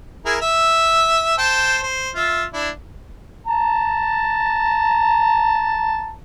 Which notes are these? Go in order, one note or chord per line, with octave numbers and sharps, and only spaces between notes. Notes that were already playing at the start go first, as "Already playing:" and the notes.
E4 G#4 A#4
E5
C5 G5 A5
C5
F4 E5
D4 E4
A5 A#5